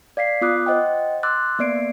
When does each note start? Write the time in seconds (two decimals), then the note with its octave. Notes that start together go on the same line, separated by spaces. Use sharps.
0.17 D5 F5 B6 C7
0.41 B3 F4 D6 D#6 F#6
0.66 C5 D#5 F#5 G5
1.23 C6 D6 E6 F#6 A6
1.59 A#3 B3 D5 C7 D7